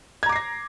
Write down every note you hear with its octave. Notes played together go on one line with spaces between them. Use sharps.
A#5 D6 G#6 A#6 C7